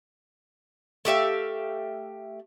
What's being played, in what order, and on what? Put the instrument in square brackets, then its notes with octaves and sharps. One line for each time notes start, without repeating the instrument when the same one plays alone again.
[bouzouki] A3 G4 E5 F5